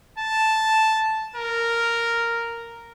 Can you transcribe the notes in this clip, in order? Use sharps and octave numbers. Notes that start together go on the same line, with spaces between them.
A5
A#4